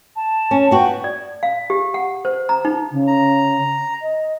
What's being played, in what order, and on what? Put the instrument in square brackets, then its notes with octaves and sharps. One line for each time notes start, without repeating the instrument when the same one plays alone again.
[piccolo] A5
[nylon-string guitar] C#4
[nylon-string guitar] B3 F#4 [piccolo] G5
[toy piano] D5
F5
G4
F#5
C5
A#5
D#4
[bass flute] C#3
[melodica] A#5
[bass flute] D#5